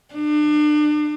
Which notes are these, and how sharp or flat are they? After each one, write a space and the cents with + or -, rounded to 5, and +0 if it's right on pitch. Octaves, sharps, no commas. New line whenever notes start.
D4 +35